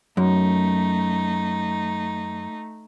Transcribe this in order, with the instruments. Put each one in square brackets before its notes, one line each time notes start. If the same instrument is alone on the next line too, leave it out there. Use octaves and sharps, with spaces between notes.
[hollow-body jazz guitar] F#2 [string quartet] A3 D#4